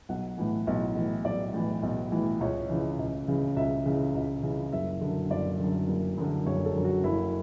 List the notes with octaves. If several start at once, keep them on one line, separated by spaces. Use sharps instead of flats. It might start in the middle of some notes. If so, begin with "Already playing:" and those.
B1 F#5
A2 E3
B1
A2 E3
B1 D5
A2 E3
B1
A2 E3
C#2 C#5
C#3 E3
C#2
C#3 E3
C#2 E5
C#3 E3
C#2
C#3 E3
F#1 E5
F#2 D3
F#1 D5
F#2 D3
F#1
F#2 D3
F#1 C#5
A4
F#2 D3
F#4
F#1 E4